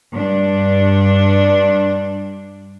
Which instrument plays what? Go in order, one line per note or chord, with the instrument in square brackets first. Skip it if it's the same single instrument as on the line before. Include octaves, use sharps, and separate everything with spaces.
[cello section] G2 D4